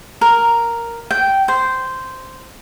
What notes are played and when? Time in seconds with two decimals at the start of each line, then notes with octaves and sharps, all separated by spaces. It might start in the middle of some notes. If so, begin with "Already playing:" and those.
0.21 A#4
1.11 G5
1.48 C5